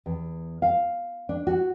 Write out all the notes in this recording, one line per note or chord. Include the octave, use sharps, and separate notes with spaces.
E2
F5
D4
F#4